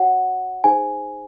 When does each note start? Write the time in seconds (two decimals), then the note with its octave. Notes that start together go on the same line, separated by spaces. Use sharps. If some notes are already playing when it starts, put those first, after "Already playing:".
Already playing: F#4 C#5 F#5
0.64 D#4 G#4 C5 G#5